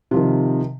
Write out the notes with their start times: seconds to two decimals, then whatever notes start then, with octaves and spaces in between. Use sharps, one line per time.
0.11 C3
0.14 F3
0.16 D#3